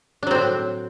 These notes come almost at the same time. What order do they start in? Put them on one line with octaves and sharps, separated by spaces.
D4 F#3 C4 A2